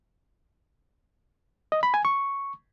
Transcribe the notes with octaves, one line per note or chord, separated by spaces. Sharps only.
D#5
B5
G#5
C#6